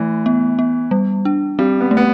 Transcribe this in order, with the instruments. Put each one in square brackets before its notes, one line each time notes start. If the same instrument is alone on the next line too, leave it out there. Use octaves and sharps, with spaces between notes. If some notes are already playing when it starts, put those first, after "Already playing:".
Already playing: [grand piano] E3 [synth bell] A3
[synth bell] B3
B3
G3
D4
[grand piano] G3 [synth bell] C4
[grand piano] B3
[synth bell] A3
[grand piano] B3